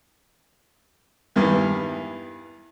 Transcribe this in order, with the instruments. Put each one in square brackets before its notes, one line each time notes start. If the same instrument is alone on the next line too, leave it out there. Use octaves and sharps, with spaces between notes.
[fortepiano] E2 G2 D#3 E3